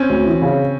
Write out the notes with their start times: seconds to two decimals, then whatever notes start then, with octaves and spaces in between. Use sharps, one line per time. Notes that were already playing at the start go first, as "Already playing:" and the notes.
Already playing: C4 C#4
0.09 D2
0.26 E3
0.42 C#3